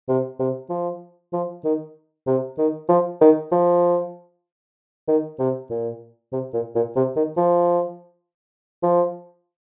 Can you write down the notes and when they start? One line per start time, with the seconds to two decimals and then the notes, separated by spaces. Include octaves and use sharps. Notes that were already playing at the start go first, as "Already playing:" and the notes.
0.09 C3
0.40 C3
0.70 F3
1.33 F3
1.64 D#3
2.27 C3
2.58 D#3
2.89 F3
3.21 D#3
3.52 F3
5.08 D#3
5.40 C3
5.71 A#2
6.33 C3
6.54 A#2
6.76 A#2
6.96 C3
7.16 D#3
7.37 F3
8.83 F3